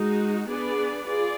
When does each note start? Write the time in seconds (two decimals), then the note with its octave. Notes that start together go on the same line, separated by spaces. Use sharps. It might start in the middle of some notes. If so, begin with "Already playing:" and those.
Already playing: G#3 D#4 F#4
0.48 B3 D4 G#4 B4 D5
1.07 F4 G#4 D5